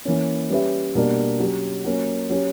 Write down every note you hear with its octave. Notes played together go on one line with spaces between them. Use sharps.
E3 A#3 C#4
G3 C#4 G4 B4 E5
B2 G3 A#3 D4
F#3 C#4 G4
F#3 A#3 C#4
F#3 C#4 G4